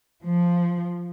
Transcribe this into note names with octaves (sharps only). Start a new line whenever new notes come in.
F3